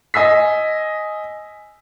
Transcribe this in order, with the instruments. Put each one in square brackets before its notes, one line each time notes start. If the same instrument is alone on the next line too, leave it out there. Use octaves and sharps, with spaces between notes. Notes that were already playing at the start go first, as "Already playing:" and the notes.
[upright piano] D#5 G#5 E6 B6